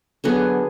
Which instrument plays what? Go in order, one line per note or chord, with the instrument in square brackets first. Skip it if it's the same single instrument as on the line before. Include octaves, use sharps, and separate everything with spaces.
[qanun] D3 F#3 B3 G#4